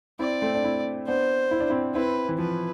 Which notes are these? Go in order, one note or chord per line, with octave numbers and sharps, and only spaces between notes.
C4 E4 D5
A3 C4
D4
C4 E4
B3 D4 C5
E4
D4
C4 E4
C4 E4 B4
E3
F3 B4